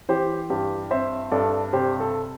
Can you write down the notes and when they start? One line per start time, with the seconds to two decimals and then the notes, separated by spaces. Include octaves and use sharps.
0.09 E3 G4 C5
0.50 G2 G4
0.91 C4 C5 E5
1.31 G2 A4 D5
1.73 C3 G4 C5
2.00 A4